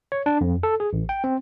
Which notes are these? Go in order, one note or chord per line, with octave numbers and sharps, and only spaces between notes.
C#5
D4
F2
A4
G#4
A1
G5
C4